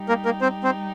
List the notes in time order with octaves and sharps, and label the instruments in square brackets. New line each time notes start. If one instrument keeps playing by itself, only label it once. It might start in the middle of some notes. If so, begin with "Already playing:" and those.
Already playing: [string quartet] G3 D#4 G4
[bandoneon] A#3 A#4
A#3 A#4
C4 C5
C4 C5